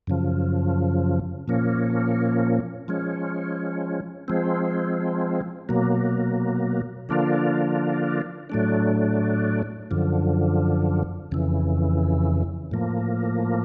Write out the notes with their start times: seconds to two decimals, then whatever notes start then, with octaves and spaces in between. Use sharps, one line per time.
0.07 F#2 C#3 F3
1.48 A#2 F3 A#3 C#4
2.88 F3 G#3 C#4
4.28 F3 G#3 C4
5.69 B2 F#3 A#3
7.09 D3 F3 A#3 D4 F4
8.50 A2 F#3 A3 D4
9.91 F#2 D3 F3
11.32 F2 C#3 E3
12.71 A2 F3 A#3